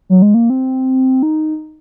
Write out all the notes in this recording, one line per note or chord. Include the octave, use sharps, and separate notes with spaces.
F#3
G#3
A#3
C4
D#4